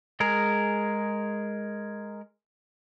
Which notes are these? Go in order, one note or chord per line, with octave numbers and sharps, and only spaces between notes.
G#3 G#4 A#4